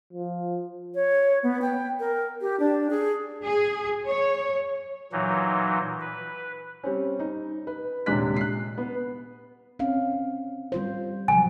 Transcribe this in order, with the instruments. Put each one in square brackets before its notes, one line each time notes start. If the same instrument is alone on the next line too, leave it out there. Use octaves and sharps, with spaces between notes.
[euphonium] F3
[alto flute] C#5
B3
G5
A#4
G4
D4
G#4
[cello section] G#4
C#5
[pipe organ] A#2 E3 F#3 D#4
B4
[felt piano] G3 C4 C#4
D#4
B4
D#1 C3 G#3 D4 F#6 B6
F#6 C7
B3
[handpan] C4 C#4 F5
G3 F4 C5
[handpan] C3 F3 F#3 [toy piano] G#5